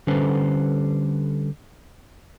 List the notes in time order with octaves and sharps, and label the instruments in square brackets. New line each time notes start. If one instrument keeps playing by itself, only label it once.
[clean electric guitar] D3 G3 C#4 A4 B4 C5